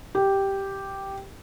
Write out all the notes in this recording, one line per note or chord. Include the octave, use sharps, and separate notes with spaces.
G4